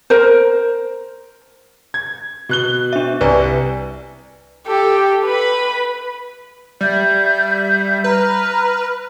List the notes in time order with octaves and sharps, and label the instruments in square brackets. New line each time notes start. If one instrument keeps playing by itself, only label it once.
[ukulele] A#4 C5
[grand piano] G#6
B2 F#6 G7
[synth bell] D4 E5
[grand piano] C2 [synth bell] B4 D5 G#5
[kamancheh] G4 A4
B4 B5
[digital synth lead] G3 [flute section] E5 G6
[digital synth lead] B4 [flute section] A#5 B5 F6